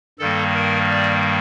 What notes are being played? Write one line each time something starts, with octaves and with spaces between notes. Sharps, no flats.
G2 D#3 G3 A#3 A4
A#4
D5